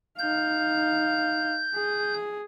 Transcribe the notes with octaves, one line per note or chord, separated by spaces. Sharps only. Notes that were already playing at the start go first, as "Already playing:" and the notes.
D#4 F5 G6
G#4